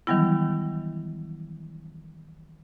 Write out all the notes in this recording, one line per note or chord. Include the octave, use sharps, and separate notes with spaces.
D#3 E3 F#3 G3 B3 E4